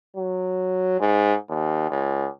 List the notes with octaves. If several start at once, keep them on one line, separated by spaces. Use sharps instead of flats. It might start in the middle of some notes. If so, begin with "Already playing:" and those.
F#3
G#2
D#2
C#2